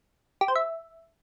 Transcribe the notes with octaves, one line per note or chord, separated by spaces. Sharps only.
G4
C5
E5